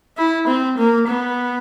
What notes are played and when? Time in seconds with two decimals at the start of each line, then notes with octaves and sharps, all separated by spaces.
0.17 E4
0.47 C4
0.77 A#3
1.07 B3